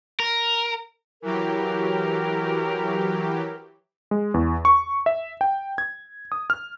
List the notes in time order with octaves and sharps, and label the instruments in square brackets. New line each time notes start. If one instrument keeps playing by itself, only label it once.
[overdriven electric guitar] A#4
[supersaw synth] E3 F#3 G4 [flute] A#4
[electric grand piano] G#3
E2
C#6
E5
G5
G#6
D#6
F6